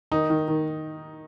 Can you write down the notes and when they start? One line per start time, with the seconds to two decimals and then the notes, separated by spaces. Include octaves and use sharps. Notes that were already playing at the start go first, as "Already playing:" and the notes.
0.11 D#3 D#4
0.30 D#3
0.48 D#3